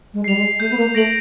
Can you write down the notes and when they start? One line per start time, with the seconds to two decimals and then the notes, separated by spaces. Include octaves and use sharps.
0.14 G#3
0.24 G3 C7 F7
0.36 G#3
0.60 A3 G6
0.70 B3
0.77 A#3
0.94 A3 A#6 D7 F#7